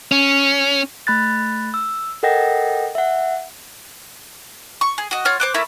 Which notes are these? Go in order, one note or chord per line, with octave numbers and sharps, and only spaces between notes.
C#4
A3 B5 F#6 A6
E6
A4 A#4 D#5 F#5 G5 A#6
E5 F#5
C#6
G#4
F#4 D#5
F4 C#5 F#5 F6
C5 D6 F#6
A3 A#3 E4 B5